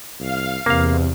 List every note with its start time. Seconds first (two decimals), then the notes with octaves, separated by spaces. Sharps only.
0.20 C2 F5
0.66 E2 C3 A#3 F5